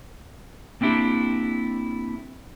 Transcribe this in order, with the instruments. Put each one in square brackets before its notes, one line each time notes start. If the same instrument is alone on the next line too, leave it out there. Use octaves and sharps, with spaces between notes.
[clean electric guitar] A#3 C4 D4 E4 G4